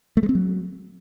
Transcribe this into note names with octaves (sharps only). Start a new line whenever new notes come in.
A3
G#3
C4
F#3